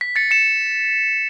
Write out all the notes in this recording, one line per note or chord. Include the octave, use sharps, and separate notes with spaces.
B6
A6 C#7
C#7 E7